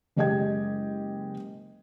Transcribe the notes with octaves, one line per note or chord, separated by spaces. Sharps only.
F#1 G#3 G4 D#5 G5 G#6